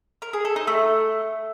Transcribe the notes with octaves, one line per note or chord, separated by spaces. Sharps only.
A#4
G#4
A4
D#4
A3